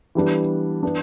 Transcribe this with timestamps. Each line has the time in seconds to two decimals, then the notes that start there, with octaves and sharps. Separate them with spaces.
0.15 E3 G3 B3 D4
0.83 E3 B3 D4